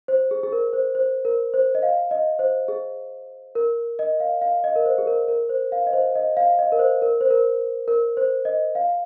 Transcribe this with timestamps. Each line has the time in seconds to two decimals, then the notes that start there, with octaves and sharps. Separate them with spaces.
0.08 C5
0.31 G#4
0.43 G#4
0.52 A#4
0.73 C5
0.95 C5
1.25 A#4
1.54 C5
1.75 D#5
1.83 F5
2.11 D#5
2.39 C5
2.68 G#4
3.55 A#4
3.99 D#5
4.20 F5
4.41 F5
4.64 D#5
4.76 A#4
4.86 C5
4.98 G#4
5.07 A#4
5.28 A#4
5.49 C5
5.72 F5
5.87 D#5
5.93 C5
6.15 D#5
6.37 F5
6.59 D#5
6.72 A#4
6.79 C5
7.02 A#4
7.21 C5
7.30 A#4
7.88 A#4
8.17 C5
8.45 D#5
8.75 F5